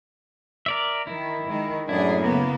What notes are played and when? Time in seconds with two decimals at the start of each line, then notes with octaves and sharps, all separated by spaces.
0.66 A#4 D5 E5
1.07 D#3 E4
1.47 D#3 G#3
1.89 F#2 A2 D4 E4 G#4
2.22 C#3 A#3 B3